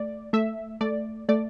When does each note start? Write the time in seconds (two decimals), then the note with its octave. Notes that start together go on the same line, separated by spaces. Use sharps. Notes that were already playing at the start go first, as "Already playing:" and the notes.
Already playing: A3 D5
0.33 A3 E5
0.81 A3 D5
1.29 A3 D5